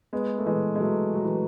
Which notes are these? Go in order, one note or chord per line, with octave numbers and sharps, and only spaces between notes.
G#3 B3
A3
E3 G#3
G#3
F#3 A3
F#3
E3